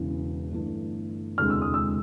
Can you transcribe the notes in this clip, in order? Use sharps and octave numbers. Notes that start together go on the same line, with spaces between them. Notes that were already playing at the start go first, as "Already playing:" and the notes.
Already playing: E1 E2 C#3 E3
G1 G2 E3 A3
E1 D2 C3 E3 G#3 F6
E6
D#6
E6